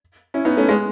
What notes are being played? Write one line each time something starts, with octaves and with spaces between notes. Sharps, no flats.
C#4 E4
B3 D#4
A3 C#4
G#3 B3